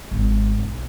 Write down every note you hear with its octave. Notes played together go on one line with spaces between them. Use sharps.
G#1
B1